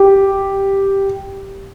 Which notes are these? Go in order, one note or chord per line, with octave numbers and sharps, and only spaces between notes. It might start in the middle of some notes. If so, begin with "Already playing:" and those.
Already playing: G4